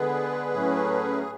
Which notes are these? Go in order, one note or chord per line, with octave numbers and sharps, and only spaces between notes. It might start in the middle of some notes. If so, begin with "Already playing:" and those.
Already playing: D3 G#3 B3 G#4 B4
A2 F#3 A3 C#4